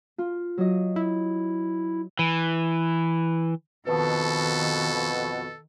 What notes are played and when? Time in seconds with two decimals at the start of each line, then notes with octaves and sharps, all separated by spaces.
0.18 F4
0.58 F#3 D#5
0.96 E4
2.19 E3
3.87 F2 B2 D#3 A4 B4 A5 D#6